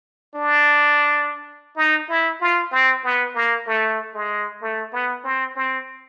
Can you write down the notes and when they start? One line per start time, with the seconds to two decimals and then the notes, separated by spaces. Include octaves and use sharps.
0.35 D4
1.77 D#4
2.09 E4
2.41 F4
2.72 C4
3.04 B3
3.35 A#3
3.66 A3
4.14 G#3
4.62 A3
4.92 B3
5.24 C4
5.56 C4